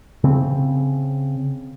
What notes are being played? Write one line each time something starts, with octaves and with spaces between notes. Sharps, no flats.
C#3 C4